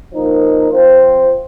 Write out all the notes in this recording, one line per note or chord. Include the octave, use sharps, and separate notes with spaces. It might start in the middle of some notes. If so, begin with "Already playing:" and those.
F3 A#3 D#4
F3 C4 F4 C5